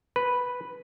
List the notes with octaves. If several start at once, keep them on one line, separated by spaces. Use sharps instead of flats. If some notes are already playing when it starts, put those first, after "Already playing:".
B4